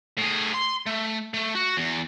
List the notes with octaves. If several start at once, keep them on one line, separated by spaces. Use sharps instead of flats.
A2 G#4
C6
A3
A3
F#4
E2